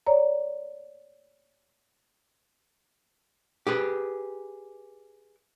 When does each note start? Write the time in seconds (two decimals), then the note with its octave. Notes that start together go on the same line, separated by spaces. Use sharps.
0.07 C#5 D5 A#5
3.67 G4 G#4 B4